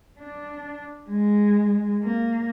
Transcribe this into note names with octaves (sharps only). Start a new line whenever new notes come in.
D4
G#3
A#3